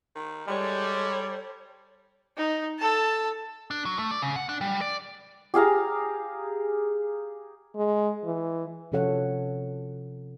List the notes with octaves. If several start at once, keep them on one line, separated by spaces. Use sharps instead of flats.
D#3
G3 G#3 A4 C#5
D#4
A4 A5
D4
F#3
A3
D5
C#3
F#5
D4
G3
D5
G4 G#4 F5 A#5
G#3
E3
C3 F3 C#4 A4 C#5 F#5